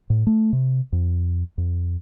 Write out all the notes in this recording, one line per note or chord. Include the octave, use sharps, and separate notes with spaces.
A2
A3
C3
F2
F2